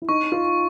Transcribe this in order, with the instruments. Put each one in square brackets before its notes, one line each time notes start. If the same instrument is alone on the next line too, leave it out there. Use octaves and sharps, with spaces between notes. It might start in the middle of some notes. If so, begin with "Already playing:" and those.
[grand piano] E4
[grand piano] D#4 [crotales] C#6
[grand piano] F4